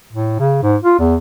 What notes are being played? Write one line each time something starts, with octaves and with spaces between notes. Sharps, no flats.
A2
C#3
G#2
F4
E2